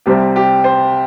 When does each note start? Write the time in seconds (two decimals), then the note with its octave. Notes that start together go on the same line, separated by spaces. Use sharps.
0.06 C2 C3 G3 C4 G4
0.36 G4
0.64 C5